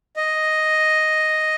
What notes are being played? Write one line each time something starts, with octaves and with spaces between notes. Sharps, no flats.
D#5